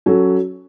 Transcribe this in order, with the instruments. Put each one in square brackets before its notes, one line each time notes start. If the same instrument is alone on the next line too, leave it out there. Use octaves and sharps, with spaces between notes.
[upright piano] F#3 C#4 F#4 A4